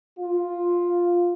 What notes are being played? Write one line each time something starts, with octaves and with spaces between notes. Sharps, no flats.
F4